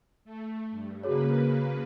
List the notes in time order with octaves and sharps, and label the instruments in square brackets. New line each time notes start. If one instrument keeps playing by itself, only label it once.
[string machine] A3
G2
[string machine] C#3 A#3 B4 [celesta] F#4 G#4 C#5